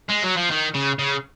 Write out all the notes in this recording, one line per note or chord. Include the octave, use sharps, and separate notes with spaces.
G#3
F#3
F3
D#3
C#3
C#3